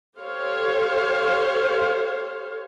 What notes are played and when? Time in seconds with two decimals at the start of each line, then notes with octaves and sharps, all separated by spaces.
0.20 G4 A4 C5 C#5 F5